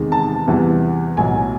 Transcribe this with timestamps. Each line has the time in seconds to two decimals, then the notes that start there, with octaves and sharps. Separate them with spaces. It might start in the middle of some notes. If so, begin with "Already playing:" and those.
Already playing: E2 C3 D#3 G#3
0.12 A5
0.47 E2 C3 E3 G3
1.17 B1 A2 F#3 G#5